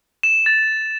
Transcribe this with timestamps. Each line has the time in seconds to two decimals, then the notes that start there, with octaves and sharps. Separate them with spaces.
0.23 E7
0.46 A6